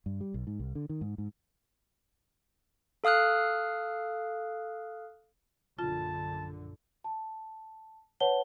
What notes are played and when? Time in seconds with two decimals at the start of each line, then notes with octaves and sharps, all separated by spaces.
0.06 G2
0.21 G3
0.34 B1
0.47 G#2
0.60 C2
0.75 D3
0.89 D#3
1.01 G#2
1.18 G#2
3.04 A4 F5 D#6 F6 F#6
5.79 A#1 F#2 D3 F4 A5
7.04 A5
8.20 B4 C#5 F#5 A5 G7